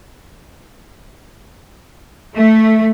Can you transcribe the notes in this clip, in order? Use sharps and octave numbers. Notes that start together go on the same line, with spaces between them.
A3